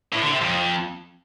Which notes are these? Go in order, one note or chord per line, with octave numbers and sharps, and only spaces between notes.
A2
D3
C3
F2